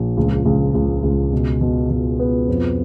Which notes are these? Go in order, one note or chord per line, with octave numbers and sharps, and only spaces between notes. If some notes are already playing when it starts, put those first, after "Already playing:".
Already playing: A#1
C#2
C#2
C#2
C#2
B2
B2
B2
B3
F2